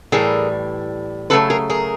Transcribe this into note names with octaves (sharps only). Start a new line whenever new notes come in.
A2 E3 G3 G#4 A#4
C#3 F#3 A3 A4 B4
G#4 A#4
G#4 A#4